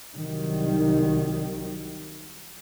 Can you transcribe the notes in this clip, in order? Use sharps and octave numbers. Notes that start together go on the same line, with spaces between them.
C2 D#3 F#3 G3